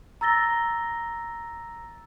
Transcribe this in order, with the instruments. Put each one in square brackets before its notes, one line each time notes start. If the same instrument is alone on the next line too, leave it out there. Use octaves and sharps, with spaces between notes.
[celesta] A#5 E6 A6 A#6 G7